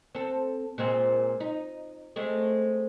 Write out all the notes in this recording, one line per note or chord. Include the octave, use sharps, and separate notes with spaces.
C4 A4
A#2 G#3 C4
D#4
G#3 A3 C4